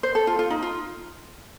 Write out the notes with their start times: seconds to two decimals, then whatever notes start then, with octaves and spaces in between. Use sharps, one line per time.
0.03 C5
0.15 A4
0.27 F4
0.39 F4
0.50 D#4
0.62 F4